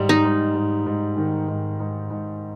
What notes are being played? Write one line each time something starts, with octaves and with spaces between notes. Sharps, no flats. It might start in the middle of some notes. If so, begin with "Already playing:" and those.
Already playing: G#2 G3
D#4
G#2
G#2
G#2
D#3
G#2
G#2
G#2